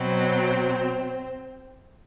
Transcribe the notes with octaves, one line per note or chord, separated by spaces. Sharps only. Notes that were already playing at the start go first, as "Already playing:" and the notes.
Already playing: B2 F#3 C4